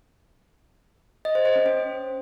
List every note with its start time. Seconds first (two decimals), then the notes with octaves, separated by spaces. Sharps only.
1.25 D#5
1.35 C5
1.45 C5
1.56 C#4
1.66 C#4